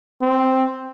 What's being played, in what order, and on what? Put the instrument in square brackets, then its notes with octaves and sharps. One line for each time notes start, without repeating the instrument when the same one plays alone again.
[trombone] C4